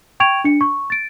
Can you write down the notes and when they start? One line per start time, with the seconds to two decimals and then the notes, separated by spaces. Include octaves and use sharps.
0.20 G5 C#6 G#6 D7 F7
0.45 D4 C#7
0.61 C#6
0.90 A6 D7